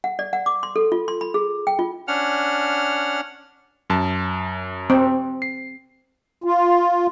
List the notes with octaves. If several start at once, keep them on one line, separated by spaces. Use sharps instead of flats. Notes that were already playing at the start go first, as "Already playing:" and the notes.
F#5
D5
F#5
D6
C6
A4
F4
C6
B5
G#4
G5
F4
C#4 D4 F#5 F6
F#2 A5
C4
C7
F4